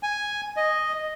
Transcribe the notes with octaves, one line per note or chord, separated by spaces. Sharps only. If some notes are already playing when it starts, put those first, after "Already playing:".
G#5
D#5